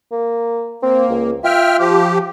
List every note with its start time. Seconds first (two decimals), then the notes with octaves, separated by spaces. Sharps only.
0.12 A#3
0.83 A#3 C4
1.10 C#2
1.44 F4 E5 G5 F6
1.79 F3 G4